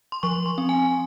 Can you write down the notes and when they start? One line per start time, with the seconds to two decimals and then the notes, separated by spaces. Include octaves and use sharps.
0.12 C6
0.23 F3 C#6
0.46 C6
0.58 C4
0.69 G#5